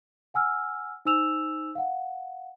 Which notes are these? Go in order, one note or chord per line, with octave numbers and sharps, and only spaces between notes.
F#5 G#5 E6 F6
D#4 C5 G#5 E6 E7 F7
F5 F#5